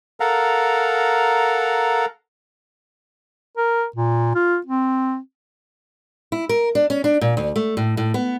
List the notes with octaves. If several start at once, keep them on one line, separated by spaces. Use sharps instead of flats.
A4 A#4 F5 F#5 A#5
A#4
A#2
F4
C4
E4
A#4
D4
C#4
D4
A#2
D2
A3
A2
A2
B3